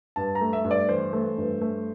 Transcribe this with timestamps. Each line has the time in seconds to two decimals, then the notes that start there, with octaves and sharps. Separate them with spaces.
0.16 G2 A5
0.35 A#5
0.41 A3
0.53 E5
0.64 G2
0.71 D5
0.89 E3 C5
1.13 A3
1.38 G2
1.61 A3